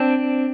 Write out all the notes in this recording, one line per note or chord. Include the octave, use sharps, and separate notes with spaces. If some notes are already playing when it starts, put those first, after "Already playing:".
Already playing: C4 D4